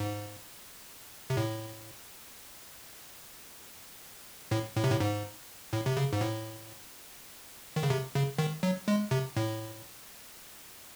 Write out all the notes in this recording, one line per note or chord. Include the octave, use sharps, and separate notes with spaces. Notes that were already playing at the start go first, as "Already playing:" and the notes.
Already playing: G#2
C3
A2
A2
A2
C3
A2
G#2
A2
C3
C#3
G#2
A2
D#3
C#3
C3
C#3
D#3
F#3
G#3
C3
A2